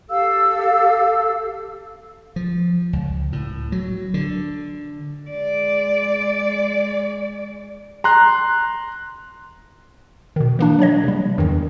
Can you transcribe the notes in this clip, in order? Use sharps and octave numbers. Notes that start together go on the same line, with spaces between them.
G4 A4 F5 E6
F3
C#2
A2
F#3
D3
G#3 D5
A#5 C6 F#6
B2 D#3
E3 A#3 D4
F#3 D4 C#5 D#5
C3 G3
E2 G2 D#3 E3